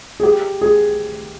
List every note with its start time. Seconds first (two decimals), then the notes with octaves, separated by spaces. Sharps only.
0.20 G#4
0.23 G4
0.61 G#4